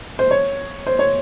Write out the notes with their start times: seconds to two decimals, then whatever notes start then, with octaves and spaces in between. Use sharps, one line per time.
0.19 C5
0.31 C#5
0.87 C5
0.99 C#5